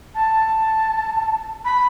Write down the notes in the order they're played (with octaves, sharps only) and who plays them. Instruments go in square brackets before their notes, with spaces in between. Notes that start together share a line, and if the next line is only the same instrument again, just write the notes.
[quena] A5
B5